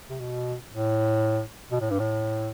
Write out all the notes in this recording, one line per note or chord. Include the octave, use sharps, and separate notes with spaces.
C3
B2
A2
B2
A2
G2
A2